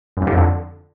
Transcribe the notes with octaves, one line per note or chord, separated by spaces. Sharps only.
F#2
G2
D3
F2
D3